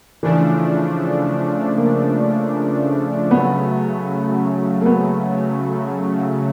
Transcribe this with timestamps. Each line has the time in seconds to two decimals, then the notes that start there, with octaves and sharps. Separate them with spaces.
0.23 C#3 E3 F3 A3 D4
1.77 A#3
3.31 C#3 F#3 A3 B3
4.81 A#3
4.86 B3